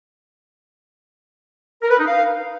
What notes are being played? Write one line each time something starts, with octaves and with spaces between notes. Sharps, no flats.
A#4
B4
D#4
F5